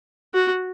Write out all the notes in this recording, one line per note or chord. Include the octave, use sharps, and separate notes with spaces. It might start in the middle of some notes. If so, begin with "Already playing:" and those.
F#4